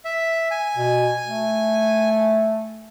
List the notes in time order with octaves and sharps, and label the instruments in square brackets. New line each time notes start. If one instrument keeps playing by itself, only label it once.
[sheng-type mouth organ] E5
G#5
[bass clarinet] B2
A3